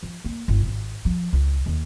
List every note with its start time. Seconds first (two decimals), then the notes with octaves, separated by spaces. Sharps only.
0.03 F3
0.24 A#3
0.48 G1
0.66 G#1
1.05 F3
1.33 C#2
1.66 D#2